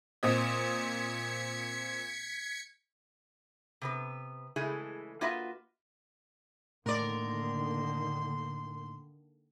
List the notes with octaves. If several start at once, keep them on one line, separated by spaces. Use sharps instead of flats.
A#2 C4 D#5 G#6 B6 C#7
C3 B3 B4
C#3 E3 G#3 A3 E4 G#4
A#3 F4 F#4 B4 D#5 E5
A2 D3 D#3 A#3 A#4 D5 C6